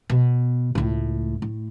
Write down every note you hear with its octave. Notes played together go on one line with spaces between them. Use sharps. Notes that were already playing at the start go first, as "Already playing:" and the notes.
B2
C#2 A2
A2